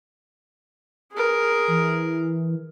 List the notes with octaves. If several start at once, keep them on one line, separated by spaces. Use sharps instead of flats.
G#4 A#4
E3